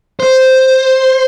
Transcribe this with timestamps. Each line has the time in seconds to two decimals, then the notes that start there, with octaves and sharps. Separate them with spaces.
0.20 C5